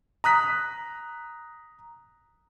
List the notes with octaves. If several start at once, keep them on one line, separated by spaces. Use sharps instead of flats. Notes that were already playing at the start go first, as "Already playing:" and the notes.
A#5 D#6 F#6 B6